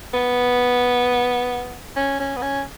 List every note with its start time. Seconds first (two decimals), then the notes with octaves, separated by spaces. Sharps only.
0.14 B3
1.96 C#4
2.19 C#4
2.36 B3
2.42 C#4